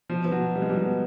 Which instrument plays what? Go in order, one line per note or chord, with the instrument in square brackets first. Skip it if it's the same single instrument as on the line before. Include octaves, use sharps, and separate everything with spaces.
[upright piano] B2 [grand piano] F3
[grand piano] F3 [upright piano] B3
[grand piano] F#3
[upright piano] B2
[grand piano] G3 [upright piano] B3
[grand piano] G#3
[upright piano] B2 [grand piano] G3
[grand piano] F#3
[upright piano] B3